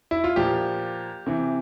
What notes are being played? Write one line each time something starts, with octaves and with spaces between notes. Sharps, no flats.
E4
F4
A#2 F3 G4
C3 E3